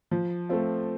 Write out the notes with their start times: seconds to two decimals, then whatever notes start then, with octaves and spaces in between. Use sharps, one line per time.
0.11 F3
0.49 A3 C4 F4